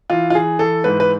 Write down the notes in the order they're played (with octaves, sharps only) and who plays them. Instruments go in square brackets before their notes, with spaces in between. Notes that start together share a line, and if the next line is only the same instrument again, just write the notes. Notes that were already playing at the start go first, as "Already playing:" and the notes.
[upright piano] E3 F4
F4
E3 G#4
E3 A4
G#2 B4
B4